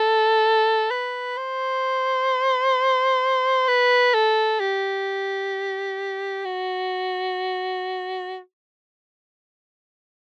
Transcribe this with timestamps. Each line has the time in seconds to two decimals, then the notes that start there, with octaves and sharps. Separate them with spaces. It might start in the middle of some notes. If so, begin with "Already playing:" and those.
Already playing: A4
0.91 B4
1.37 C5
3.68 B4
4.14 A4
4.60 G4
6.45 F#4